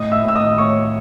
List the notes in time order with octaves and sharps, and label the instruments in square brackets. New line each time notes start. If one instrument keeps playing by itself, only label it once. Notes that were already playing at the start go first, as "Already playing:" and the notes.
Already playing: [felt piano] A2 [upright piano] D#5 D#6
[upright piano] E5 E6
[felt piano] A2 [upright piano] E6
[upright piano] D#5 D#6
[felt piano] A2 [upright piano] C#5 C#6